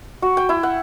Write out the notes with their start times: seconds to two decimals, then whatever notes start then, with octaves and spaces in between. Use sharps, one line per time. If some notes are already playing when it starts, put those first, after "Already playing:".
0.22 F#4
0.37 G5
0.49 E4
0.63 F#5